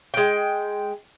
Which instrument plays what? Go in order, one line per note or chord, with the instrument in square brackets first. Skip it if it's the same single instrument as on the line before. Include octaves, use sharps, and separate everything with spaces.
[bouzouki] G#3 G5